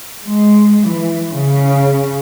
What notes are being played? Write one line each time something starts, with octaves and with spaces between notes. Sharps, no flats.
G#3
E3
C#3